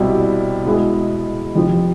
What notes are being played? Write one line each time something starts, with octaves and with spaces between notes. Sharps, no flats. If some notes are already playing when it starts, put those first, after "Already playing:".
Already playing: C2 B2 G3 C4 E4
B2 G#3 B3 E4 G#4
F2 C3 F3